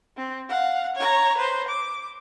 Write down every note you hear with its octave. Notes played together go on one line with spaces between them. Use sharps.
C4
F5 F#5
C#5 A#5
B4 C5
D6